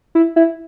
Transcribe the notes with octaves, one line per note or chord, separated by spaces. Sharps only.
E4
E4